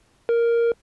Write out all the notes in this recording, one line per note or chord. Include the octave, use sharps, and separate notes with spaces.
A#4